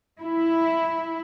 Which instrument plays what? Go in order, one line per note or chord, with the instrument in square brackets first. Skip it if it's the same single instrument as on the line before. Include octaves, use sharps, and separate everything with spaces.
[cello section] E4